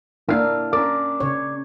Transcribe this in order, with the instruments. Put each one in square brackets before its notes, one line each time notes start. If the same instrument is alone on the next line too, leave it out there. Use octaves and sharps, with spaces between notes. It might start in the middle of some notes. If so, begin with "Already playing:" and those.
[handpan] A#3 D4 A#4 [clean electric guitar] E4 F5
[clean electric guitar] C#4 D5 [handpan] A#4
[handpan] C#3 C#5